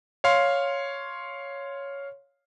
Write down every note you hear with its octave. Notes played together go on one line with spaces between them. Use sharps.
C#5 F5 C6